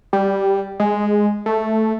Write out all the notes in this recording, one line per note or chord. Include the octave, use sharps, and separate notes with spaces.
G3
G#3
A3